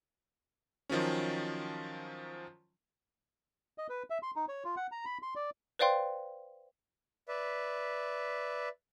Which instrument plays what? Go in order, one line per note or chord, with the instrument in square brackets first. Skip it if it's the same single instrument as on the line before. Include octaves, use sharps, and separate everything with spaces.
[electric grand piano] D#3 F3 F#3 C#4
[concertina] D#5
B4
E5
C6
D#4
C#5
F4
F#5
A#5
B5
C6
D5
[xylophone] B4 C5 D5 F5 G5 C6
[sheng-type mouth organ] B4 D5 E5